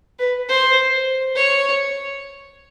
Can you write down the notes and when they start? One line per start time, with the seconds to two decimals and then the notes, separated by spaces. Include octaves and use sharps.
0.19 B4
0.49 C5
1.36 C#5